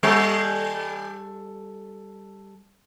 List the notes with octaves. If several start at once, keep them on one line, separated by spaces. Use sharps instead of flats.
G3 A4